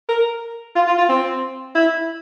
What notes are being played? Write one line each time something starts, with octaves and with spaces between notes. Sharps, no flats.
A#4
F4
F4
F4
C4
E4